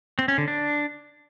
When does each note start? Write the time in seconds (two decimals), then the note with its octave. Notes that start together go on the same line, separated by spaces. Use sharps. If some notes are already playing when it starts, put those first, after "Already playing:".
0.19 C4
0.28 C#4
0.38 D3
0.48 D4